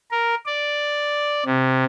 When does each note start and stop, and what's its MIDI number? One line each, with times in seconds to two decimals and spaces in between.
0.11 0.35 70
0.46 1.43 74
1.45 1.84 48